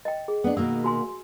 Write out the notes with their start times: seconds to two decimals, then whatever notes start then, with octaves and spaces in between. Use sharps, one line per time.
0.05 D#5 G5
0.28 G#4
0.44 B3 D4
0.57 B2 D#3 A#3 E6
0.84 F#4 G#5 C6